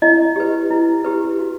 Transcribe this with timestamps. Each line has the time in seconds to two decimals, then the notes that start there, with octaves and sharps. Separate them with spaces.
0.02 E4 D#5
0.36 G4 B4
0.71 E4
1.04 G4 B4
1.39 F#4